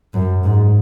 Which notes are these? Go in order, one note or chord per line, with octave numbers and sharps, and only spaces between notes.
F#2
G#2